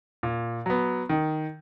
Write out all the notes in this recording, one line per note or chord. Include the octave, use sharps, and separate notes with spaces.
A#2
F#3 B3
D#3